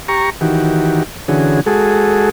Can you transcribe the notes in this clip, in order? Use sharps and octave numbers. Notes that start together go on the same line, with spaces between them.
G4 A#5 C#6
D#3 E3 F#4 G4
D3 E3 C#4 F#4 G#4
G#3 F#4 G#4 A4